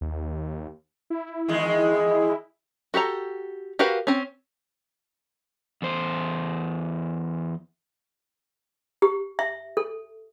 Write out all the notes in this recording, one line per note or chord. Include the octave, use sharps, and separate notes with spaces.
D#2
E4
E2 D#3 G#3
F#4 G4 A4 A#5
F#4 G4 A#4 B4 F5
C4 C#4
E2 C5
G4
E5
A4